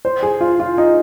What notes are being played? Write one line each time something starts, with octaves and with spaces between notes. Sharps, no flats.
C5
G#4
F4
F4
D#4